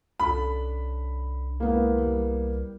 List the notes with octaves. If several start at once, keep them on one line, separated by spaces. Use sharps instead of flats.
C2 C#4 D4 A4 B5
G#3 A#3 B3 E4
G3